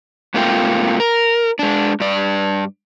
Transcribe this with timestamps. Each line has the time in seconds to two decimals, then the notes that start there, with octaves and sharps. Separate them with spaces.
0.34 G#2 C3 A3 A#3 F4 G5
1.00 A#4
1.59 G#3 D4
2.00 G2 D5